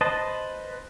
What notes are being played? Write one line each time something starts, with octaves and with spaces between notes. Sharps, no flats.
B4 C5 D#5 A5